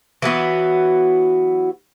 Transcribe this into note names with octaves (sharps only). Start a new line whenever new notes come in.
E3 F#3 B3 F#4